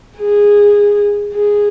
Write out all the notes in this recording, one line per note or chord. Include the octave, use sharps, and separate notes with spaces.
G#4
G#4